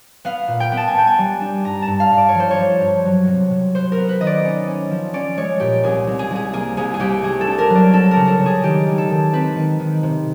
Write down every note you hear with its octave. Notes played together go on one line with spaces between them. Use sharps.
B3 F5
A#2
G5
B3
A5
G#5
B3 G5
G#5
G3
D4
G2 A#5
A5
G2
F5
G2
D5
C#5
F3 C5
C#5
F3
G2
F#3
C3
C3
B3 C5
A#4
B3
B4
D#3 D#5
D5
C#4
C#4
F3
C#4 D5
G#3 C#5
A#2 G4
C2 G#4
C2
G#4
C2
G#4
A#3 G#4
C2 G#4
G#4
C2 G4
A3 G#4
A4
D4
A#4
F#3
D5
D4 A4
A#4
C#3
A4
C#3
G#4
D#3 G4
G#3
A4
D#3
C4 B4
D#3
D#3
C3